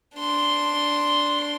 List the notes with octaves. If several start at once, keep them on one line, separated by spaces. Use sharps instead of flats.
D4 C6